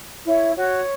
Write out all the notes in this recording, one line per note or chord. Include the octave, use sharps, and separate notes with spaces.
E4 C#5
F#4 C#5